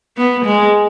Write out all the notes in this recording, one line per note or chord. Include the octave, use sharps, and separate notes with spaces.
B3
G#3